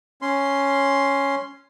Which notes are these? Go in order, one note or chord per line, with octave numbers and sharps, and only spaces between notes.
C#4 C6